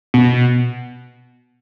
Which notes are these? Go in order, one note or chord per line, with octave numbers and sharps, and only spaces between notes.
B2